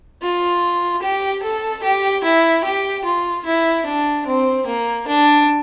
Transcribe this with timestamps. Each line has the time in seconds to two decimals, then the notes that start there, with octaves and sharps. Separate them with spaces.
0.22 F4
1.02 G4
1.42 A4
1.83 G4
2.24 E4
2.64 G4
3.04 F4
3.45 E4
3.85 D4
4.26 C4
4.66 A#3
5.07 D4